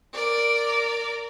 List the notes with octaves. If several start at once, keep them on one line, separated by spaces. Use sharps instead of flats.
A#4 D5